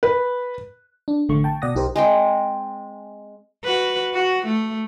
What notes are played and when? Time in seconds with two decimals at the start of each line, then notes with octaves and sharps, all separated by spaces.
0.03 B4
1.08 D4
1.29 A1 D3 A3 C#6
1.44 G5 A5
1.62 B2 D5 F#5 D#6 A#6
1.75 B1 D#4 G4 A#4 C5
1.96 G#3 C4 G5
3.65 F#4 B4
4.14 F#4
4.46 A3